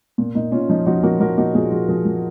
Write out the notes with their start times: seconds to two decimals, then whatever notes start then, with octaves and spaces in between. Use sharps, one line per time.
0.18 A#2
0.35 A#2 D#4
0.52 A#2 C#4 F4
0.69 F3 D#4
0.86 F3 D#4 F#4
1.03 A#2 F#4 A#4
1.20 F3 F#4 A#4
1.37 A#2 D#4 F#4
1.54 A#2 F4 G#4
1.72 F3 F4 G#4
1.89 F3 F4 G#4
2.05 F3